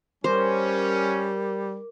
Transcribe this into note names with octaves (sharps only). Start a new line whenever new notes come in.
G3 C#4 A#4 C5 D6